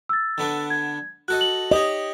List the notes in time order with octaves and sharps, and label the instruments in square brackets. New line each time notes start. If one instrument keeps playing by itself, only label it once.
[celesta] E6 A6
[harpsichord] D3 B3 D4
[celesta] G#6
[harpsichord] F#4 A4 D#5 [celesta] F#6
[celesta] F#7
[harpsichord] G4 C#5 [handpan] D#5